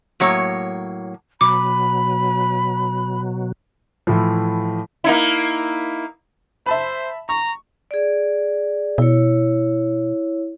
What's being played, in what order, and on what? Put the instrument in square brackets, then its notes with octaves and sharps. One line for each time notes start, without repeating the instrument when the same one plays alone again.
[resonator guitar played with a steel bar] A2 F#3 A#3 C#5
[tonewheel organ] B2 F#3 [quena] B5 [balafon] D6
[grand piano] A2 E3 F3
[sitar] A#3 D#4 E4
[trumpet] C5 [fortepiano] E5 A5 B5
[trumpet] A#5 [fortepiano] C#6
[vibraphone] G#4 D5
[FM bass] B2 [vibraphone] E4 C#5